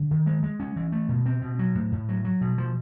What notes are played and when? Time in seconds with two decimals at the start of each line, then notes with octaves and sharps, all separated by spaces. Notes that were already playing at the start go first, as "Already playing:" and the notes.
Already playing: D3
0.11 D#3
0.26 G#3
0.43 G#3
0.60 C#4
0.76 E3
0.92 A3
1.09 B2
1.26 C4
1.42 B2
1.59 F#3
1.75 A2
1.92 A2
2.09 F#3
2.25 F#3
2.41 B2
2.58 F3